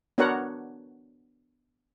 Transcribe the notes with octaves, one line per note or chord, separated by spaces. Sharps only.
B3 D4 F#4 A#4 C#5 F#5